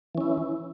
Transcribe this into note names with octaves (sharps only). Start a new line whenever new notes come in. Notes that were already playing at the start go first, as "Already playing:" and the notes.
E3 C#4 E4